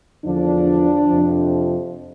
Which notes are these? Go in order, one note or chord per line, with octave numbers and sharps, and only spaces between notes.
E2 D3 F3 D4
F2 C3 F3